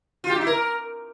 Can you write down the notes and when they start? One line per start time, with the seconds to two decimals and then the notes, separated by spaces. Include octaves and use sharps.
0.24 F4
0.30 G4
0.35 D#4
0.41 E4
0.47 A#4